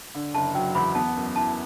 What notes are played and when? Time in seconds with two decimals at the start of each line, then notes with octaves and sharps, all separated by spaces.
0.14 D3
0.35 F#1 A5
0.55 F#3 G5
0.75 E2 B5
0.95 B3 A5
1.16 F#2
1.36 E4 A5